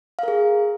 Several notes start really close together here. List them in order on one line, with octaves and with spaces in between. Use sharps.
F5 A#4 G#4